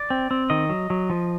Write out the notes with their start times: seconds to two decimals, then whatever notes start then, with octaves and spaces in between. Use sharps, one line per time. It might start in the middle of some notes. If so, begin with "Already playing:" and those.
Already playing: D5
0.10 C4
0.31 C4
0.50 D#3 D#5
0.70 F#3
0.90 F#3
1.10 F3